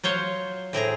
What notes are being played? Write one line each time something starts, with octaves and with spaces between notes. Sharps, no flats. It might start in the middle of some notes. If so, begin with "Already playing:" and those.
F#3 F4 C5 C#5
A2 C4 G#4 A#5